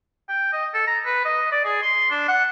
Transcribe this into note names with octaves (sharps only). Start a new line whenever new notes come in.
G5
D#5
A4
A#5
B4
D#5
D5
G#4
C6
D4
F#5